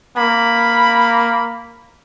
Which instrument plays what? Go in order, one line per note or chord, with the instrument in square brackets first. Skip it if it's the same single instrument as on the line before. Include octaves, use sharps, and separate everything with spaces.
[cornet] A#3 [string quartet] B5